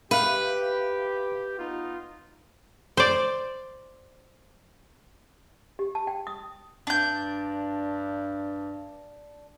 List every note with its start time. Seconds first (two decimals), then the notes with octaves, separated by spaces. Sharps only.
0.11 G4 B4 E5 F5 F#6
1.59 B3 D#4 F4
2.97 C5 D5
5.79 G4
5.95 A5
6.07 G5
6.27 D#6
6.87 G2 D4 G6